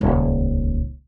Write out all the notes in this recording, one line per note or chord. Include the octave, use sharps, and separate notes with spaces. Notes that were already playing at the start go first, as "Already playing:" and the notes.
D#1 C#2